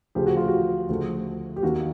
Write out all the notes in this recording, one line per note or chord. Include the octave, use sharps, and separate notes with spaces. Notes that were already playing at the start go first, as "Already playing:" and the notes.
D2 C#3 F3 G4
F#4
F4
F#4
D2 C#3 F3 A3
G4
D#2 D#3 G3 A#3 F#4